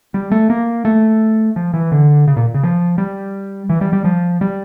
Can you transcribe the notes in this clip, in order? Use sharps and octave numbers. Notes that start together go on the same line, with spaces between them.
G3
A3
A#3
A3
F3
E3
D3
C#3
A#2
C#3
F3
G3
E3
G3
G3
F3
G3